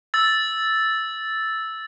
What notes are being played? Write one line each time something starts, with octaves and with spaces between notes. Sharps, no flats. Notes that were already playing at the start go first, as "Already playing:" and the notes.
E6 A6